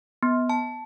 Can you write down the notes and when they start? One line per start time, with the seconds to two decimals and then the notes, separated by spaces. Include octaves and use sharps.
0.23 B3
0.50 A5